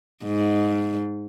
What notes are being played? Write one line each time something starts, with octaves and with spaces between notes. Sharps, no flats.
G#2